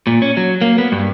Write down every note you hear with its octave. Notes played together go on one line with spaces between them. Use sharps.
A#2
C#4
F#3
A#3
B3
G2